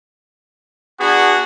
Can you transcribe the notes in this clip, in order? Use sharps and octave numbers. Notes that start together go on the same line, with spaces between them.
B3 D4 F#4 G#4